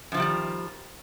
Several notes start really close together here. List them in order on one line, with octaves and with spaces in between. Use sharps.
F#2 F3 C3 G3 D#3